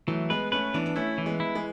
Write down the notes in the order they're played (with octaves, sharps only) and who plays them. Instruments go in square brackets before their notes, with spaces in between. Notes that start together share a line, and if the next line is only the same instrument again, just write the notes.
[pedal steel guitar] E3 [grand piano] F#3 A3
[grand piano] G#3 B3 [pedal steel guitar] B4
[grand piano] A3 C#4 [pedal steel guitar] B4
[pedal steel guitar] E3 [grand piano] B3 D4
[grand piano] D4
[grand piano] A3 C#4 [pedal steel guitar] E4
[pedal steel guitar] E3
[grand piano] G#3 B3
[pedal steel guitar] E4
[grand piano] E3 G#3